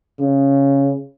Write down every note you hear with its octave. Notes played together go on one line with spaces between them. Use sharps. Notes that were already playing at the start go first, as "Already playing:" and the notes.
C#3